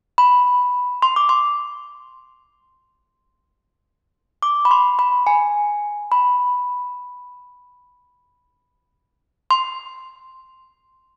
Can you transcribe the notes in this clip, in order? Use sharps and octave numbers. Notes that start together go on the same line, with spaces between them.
B5
C6
D6
C6
D6
B5
C6
B5
G#5
B5
C6